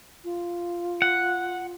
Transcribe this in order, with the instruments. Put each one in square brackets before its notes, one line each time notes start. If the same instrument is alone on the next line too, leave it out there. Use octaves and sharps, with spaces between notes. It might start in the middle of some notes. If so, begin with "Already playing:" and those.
[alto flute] F4
[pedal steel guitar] F#5